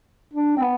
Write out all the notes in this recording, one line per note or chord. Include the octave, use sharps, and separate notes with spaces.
D4
C4
B3